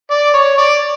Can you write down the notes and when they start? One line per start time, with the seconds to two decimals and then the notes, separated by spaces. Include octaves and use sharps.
0.11 D5
0.34 C#5
0.58 D5